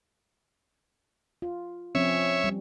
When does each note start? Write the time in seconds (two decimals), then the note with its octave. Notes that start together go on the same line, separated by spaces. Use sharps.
1.42 F4
1.95 F3 C4 C#4 C#5 E5
2.44 G3